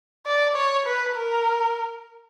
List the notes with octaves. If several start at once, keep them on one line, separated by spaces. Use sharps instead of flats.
D5
C#5
B4
A#4